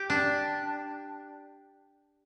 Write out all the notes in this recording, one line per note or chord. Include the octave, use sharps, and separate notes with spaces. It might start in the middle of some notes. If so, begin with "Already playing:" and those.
Already playing: G4
D4